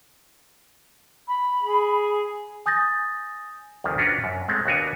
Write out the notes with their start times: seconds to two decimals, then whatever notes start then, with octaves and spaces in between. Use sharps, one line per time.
1.28 B5
1.62 G#4
2.66 G#5 D#6 G6 A6 A#6
3.84 D2 C3 D#3 F3
3.98 C#4 D4 F4 F#4 A#4 B4
4.24 F#2
4.48 G#3 A3 C4
4.65 D#2 B3 D4 F#4 A#4 G#5